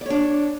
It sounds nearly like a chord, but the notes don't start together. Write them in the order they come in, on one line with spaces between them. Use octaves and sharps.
D5 C#5 D4